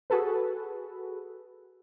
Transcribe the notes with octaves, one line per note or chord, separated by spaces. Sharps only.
F#4 G#4 A4 B4